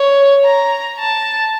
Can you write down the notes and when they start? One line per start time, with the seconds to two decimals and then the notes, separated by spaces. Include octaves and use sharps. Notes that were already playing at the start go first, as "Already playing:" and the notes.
Already playing: C#5
0.45 A#5
0.99 A5